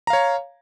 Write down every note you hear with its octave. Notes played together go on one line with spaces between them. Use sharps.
C#5 F5 A#5